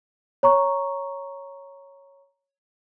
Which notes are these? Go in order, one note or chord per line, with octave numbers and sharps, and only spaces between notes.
C#5 A#5 C#6